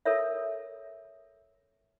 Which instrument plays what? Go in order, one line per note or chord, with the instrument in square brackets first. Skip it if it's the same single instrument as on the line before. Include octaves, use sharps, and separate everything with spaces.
[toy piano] A4 A#4 C#5 E5